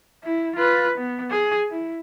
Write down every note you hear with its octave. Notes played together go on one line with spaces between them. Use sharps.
E4
F4 B4
B3
G#4
E4